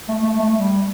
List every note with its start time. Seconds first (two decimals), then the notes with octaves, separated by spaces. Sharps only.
0.09 A3
0.23 A3
0.40 A3
0.55 G3